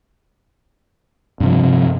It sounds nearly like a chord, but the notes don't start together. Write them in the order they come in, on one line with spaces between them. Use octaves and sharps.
G2 C3 F3